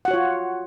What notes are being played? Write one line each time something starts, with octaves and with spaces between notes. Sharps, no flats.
F4 F#4 C#5 F#5